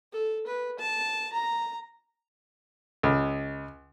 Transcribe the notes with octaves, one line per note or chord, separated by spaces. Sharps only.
A4
B4
A5
A#5
C#2